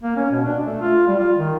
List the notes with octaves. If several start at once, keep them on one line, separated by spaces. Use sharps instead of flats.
A#3
C#4
B2
D4
A3
F4
G3
F4
D#3